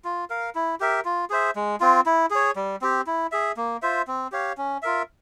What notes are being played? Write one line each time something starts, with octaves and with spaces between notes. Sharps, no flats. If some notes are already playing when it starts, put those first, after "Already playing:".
F4
A#4 F5
E4
G4 A#4 E5
F4
G#4 C5 E5
G#3
C4 F4
E4
G#4 C#5
G3
C4 G4
E4
G#4 E5
A#3
F4 C5 E5
C4
G4 C#5 F5
C#4
F4 A#4 E5